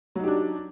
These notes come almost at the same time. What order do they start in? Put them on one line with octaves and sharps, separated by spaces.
F#3 D#4 G4 D4